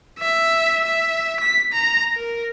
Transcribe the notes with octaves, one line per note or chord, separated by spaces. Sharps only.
E5
E5
B6
A#5
A#4